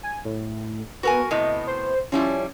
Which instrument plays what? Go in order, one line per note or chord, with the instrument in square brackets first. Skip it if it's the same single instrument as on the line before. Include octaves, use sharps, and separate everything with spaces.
[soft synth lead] G#5
A2
[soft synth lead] B3 [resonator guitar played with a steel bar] F#4 A#4 G#5
[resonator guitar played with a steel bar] A2 C3 B3 [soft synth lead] D#5
[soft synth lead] C5
[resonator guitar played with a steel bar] F3 G3 E4 [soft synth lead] C#4